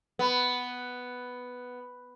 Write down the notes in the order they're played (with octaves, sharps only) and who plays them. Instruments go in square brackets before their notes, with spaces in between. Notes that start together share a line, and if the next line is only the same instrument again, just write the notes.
[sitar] B3